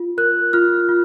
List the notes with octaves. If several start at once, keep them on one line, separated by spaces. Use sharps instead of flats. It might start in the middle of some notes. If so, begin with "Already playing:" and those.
Already playing: F4
A#4 F#6
F4 F6
F4